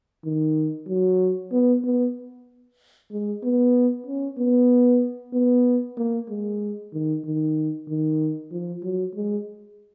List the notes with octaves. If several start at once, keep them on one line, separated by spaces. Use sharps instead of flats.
D#3
F#3
B3
B3
G#3
B3
C#4
B3
B3
A#3
G#3
D#3
D#3
D#3
F3
F#3
G#3